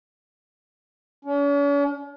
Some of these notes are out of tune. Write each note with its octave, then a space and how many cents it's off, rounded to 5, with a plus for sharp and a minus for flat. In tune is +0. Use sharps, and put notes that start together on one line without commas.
C#4 +45